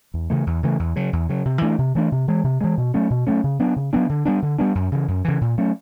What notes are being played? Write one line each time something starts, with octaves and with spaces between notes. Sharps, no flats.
E2
C#3 E3 A3
E2
C#3 E3 A3
E2
C#3 F#3
E2
C#3 F#3
C3
E3 A3 D4
C3
E3 A3 D4
C3
E3 G#3
C3
E3 G#3
B2
F#3 A3 C#4
B2
F#3 A3 C#4
C#3
F#3 B3 D4
C#3
F#3 B3 D4
D3
G3 B3 D4
D3
G3 B3 D4
F#2
C#3 E3
F#2
C#3 E3
A#2
F#3 A3 C#4